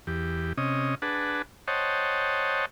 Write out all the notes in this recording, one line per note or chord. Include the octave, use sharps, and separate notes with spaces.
E2 G4
C3 C#4 D#5
D4 G#4 B4 F#5 A5
C5 C#5 D#5 F#5 G5 A5